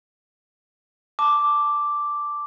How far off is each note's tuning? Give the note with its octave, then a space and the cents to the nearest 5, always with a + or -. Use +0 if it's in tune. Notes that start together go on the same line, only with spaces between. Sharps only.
A5 +0 D6 +0